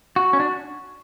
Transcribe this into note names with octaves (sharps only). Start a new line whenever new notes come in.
F#4
C#4
D4